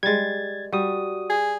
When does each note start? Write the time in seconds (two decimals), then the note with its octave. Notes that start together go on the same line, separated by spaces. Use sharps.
0.03 G3 G#3 G#6 A6
0.73 G3 F#4 D#6
1.30 G#4